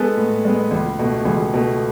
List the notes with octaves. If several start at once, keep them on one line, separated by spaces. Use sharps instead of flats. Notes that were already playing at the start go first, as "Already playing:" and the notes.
Already playing: G#3 B3 G#4 A4 B4
A2
G#3 B3
C#2
B2 A3
C#2 G#4
B2 A3